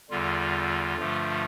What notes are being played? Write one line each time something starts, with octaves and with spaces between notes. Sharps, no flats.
E2 D3 G3 F4
G2 D3 F3 A3